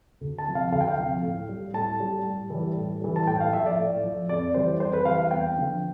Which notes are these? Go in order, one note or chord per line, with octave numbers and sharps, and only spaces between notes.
D2
A5
C3 F3
F5
D2 F5
G5
F5
C3 F3
A2
G3
A2 A5
G3
A2
E3 G3
A2
E3 G3
A5
A2 G5
F5
F3 E5
D5
A2
F3
F2 D5
E3 G3 C5
F2 C5
B4
E3 G3 F5
F5
E2 G5
D3 F3